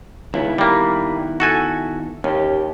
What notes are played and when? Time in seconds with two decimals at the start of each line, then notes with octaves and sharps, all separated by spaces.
0.34 C#2 D#3 B3 E4
0.58 G3 A#3
1.40 F#4 A4 G#5
2.24 D#2 C#4 G4